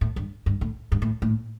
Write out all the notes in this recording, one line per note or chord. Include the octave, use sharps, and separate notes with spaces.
A2
G2
G2
A2
G2
A2
A2